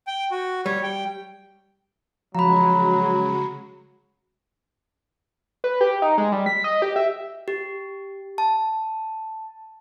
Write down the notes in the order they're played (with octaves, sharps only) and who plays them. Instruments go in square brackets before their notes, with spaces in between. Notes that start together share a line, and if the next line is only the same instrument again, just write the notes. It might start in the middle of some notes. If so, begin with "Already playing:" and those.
[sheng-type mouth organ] G5
F#4
[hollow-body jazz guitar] G3 [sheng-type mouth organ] C#5
[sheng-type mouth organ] G5
[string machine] C#3 G#3 F#4 [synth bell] F3 [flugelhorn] F#3 [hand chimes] A#5 B5
[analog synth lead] B4
G4
D#4
G#3
G3
B6
D#5
G4
E5
[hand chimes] G4
A5